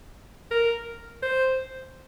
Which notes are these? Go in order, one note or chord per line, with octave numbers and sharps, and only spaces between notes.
A#4
C5